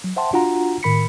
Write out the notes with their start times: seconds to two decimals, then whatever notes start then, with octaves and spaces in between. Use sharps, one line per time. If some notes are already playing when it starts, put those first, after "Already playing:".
0.04 F#3
0.16 C5 E5 F#5 G5 A5 C6
0.33 D4 F4 F#4 F#5 A#5
0.83 A2 D#3 A#4 B5 B6 C#7